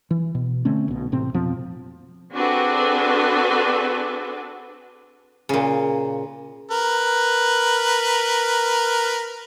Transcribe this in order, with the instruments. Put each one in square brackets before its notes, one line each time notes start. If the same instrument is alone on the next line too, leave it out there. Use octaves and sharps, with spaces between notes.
[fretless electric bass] E3
B2
D3 A3 C4 C#4
B1 B2
A1 A2 C3 C4
F2 B2 F3 C4
[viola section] C4 D4 F#4 G#4 A4 B4
[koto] A#2 C#3
[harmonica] A#4 B4